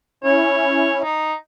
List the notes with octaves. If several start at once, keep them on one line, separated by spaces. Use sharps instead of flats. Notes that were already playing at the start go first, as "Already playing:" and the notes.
C#4 E4 C#5
D#4